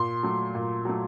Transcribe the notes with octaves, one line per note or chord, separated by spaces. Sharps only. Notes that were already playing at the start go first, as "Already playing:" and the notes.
Already playing: A#2 C6
F#3 A3
A#2
F#3 A3